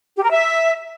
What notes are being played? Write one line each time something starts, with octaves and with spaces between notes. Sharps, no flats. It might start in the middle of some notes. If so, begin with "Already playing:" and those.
G4
A#4
E5